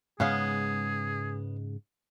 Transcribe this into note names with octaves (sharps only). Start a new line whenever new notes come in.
G#2 C#3 G#3 B3 C#4 G#4 F5